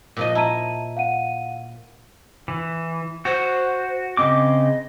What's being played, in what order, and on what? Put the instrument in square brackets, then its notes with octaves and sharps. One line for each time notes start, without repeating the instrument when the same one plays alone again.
[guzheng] A#2 F3 D#5
[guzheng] E4 [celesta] A5 A#5 D#7
[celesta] F5 F#5 D#7
[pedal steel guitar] E3
[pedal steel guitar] F#4 [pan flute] C5
[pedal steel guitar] C#3 C4 D6 [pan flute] D#5